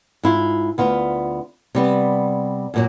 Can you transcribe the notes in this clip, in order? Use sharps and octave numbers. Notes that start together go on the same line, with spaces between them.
G#2 E4 F4
D2 B3 F4
C3 G3 B3
F#2 A#2 F#3